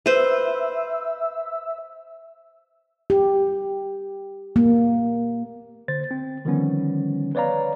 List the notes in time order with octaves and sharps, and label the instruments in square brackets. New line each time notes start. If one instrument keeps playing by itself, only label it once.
[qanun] B4 C5 [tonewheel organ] E5
[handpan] G4
A#3
[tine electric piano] D3 C5 A6
C4
D3 D#3 F3 G3 B3 C#4
B4 C#5 D5 F5 A#5